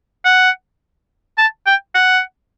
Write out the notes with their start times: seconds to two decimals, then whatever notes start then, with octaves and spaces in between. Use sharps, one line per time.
0.25 F#5
1.38 A5
1.66 G5
1.95 F#5